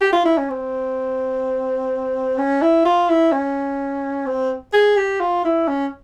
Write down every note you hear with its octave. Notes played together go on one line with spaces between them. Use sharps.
G4
F4
E4
C#4
C4
C#4
E4
F4
E4
C#4
C4
G#4
G4
F4
E4
C#4